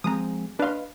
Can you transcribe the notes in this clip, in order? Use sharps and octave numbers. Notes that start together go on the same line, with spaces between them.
F3 G#3 C4 A#5 D#6
D4 B4 D#5 F5 C6